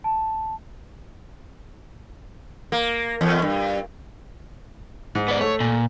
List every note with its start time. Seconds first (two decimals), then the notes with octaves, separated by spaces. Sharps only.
0.04 A5
2.72 A#3
3.21 E2
3.42 G2
5.15 G#2
5.28 B3 D5
5.41 A3 C#5
5.60 A#2